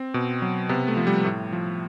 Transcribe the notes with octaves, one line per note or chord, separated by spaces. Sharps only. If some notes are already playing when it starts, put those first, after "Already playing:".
Already playing: C4
B2
F#3
C3 B3
A3
F3
G3
A2
F3